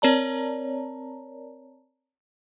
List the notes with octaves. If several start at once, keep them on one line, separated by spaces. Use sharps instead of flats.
C4 A#4 C#5 D5 A5 A#5